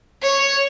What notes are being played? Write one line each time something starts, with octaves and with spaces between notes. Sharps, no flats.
C#5